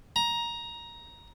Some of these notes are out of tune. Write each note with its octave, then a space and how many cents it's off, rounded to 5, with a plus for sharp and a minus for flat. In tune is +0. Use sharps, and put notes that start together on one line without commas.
A#5 +15